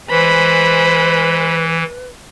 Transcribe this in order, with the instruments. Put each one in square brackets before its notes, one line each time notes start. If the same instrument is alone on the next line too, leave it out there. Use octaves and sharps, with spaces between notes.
[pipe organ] E3 [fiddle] G#3 C5 [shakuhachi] B4 [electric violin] B5